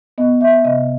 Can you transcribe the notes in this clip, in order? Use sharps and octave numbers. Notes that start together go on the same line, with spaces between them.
B3 D#5
E5
C3 D#5